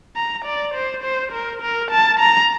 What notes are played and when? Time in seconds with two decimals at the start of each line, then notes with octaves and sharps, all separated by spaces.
0.16 A#5
0.45 D5
0.74 C5
1.03 C5
1.32 A#4
1.62 A#4
1.91 A5
2.20 A#5